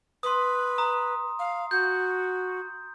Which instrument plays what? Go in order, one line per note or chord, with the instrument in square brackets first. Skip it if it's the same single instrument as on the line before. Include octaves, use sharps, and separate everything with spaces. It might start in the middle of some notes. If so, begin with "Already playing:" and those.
[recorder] B4 [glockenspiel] C6 D#6
[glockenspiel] A#5 D#6
[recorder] F5
[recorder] F#4 [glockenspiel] G6